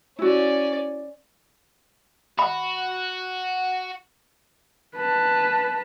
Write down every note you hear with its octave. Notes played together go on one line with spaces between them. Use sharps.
C#4 E4 F#4 D5
F#4 B5
B4 A5